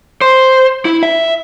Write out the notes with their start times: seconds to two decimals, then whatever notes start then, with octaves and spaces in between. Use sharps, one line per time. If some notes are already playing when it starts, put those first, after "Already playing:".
0.21 C5
0.85 E4
1.03 E5